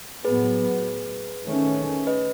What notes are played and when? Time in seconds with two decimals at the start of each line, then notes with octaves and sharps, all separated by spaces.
0.24 A2 F#3 B3 G#4 B4
1.46 D#3 A3 C#4
2.07 B4 D#5